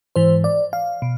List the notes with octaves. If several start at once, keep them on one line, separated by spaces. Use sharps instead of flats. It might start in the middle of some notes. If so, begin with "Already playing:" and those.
G#2 E3 C5
D5
F5
B2